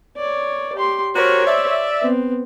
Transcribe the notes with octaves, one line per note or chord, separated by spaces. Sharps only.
C#5 D5
G4 C6
F#4 G4 A#4 C5 C#5
D5 E5
B3 C4